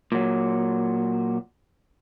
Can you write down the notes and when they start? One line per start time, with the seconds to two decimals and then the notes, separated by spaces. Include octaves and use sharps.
0.12 A#2 F#3